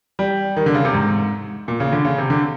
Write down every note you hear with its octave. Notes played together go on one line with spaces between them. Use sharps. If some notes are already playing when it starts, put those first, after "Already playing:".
G3
D#3
D3
C#3
C3
G#2
A#2
C#3
D3
C#3
C3
D3